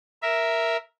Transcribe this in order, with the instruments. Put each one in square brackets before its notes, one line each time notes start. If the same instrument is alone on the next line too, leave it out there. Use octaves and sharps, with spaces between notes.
[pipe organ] A#4 E5